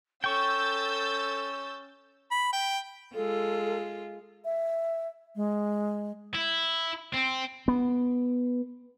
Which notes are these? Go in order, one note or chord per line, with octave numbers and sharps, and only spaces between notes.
C#4 A4 G5 C#6 E6 G6 A6
B5
G5
G#3 F4 A4
E5
G#3
E4
C4
B3